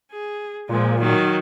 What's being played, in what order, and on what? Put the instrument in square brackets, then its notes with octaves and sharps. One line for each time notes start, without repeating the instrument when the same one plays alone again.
[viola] G#4
[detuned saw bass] A#2 [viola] F3 G#3
[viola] D#3 F#3